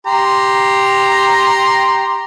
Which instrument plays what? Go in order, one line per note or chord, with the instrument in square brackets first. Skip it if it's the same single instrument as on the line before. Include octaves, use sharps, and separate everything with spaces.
[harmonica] G4 A#5 C6